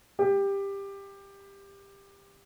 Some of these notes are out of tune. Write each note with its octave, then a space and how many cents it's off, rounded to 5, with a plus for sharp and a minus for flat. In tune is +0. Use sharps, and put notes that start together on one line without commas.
G4 +15